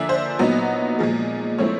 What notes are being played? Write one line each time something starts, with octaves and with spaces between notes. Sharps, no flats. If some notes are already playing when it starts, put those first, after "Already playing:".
Already playing: D3 F3 A#3 D4 E5 G#5
C5
A#2 F#3 B3 D#4
A#2 F3 G#3
F3 A3 C4 E4 C#5